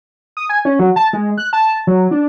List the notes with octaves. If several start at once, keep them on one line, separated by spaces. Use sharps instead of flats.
D#6
G#5
C#4
F#3
A5
G#3
F#6
A5
F#3
D4